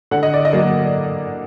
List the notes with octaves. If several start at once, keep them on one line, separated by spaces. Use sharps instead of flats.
D3 F#5
D#5
D5
D#5
F#3 A#3